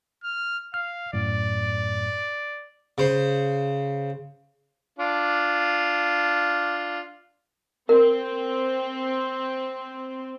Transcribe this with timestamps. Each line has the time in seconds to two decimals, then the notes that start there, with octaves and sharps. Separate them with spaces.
0.23 F6
0.74 F5 F6
1.13 F#2 A2 D5
2.98 C#3 C5
4.99 D4 F4
7.89 C4 A#4